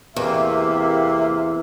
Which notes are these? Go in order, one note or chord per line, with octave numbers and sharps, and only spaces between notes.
E2 C3 A#3 E5